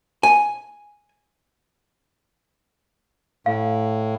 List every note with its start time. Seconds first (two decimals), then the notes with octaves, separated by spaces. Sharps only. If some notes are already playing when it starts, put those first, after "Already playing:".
0.23 G#5
3.46 A2 F5